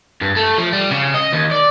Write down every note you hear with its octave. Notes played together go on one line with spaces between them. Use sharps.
G2
A3
F3
G3
C#3
D#5
D#2
D5